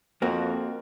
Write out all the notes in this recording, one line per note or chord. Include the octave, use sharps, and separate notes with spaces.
F2 A#3 C4 F#4